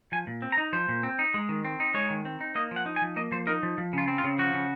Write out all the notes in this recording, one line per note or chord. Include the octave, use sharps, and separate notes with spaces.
F3 G#5
A#2
C4
A#5
D#4
F3 C5
A#2
C4
D#4
G#3
D#3
C4
D#4
G#3 C#5
D#3
C4
D#4
A#3 D#5
F3 F#5
D#4
G#5
F3
A#3 D#5
F3 C5
D#4 A#4
F3
F3
C#3 F4
C4
F4
C#3
F3 F#4
C#3